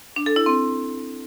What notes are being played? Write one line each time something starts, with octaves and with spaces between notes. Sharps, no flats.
D4
A4
E4
C4